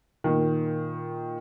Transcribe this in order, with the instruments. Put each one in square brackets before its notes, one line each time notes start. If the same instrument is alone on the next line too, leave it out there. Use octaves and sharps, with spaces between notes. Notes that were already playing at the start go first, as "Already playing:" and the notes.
[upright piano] A#2 D#3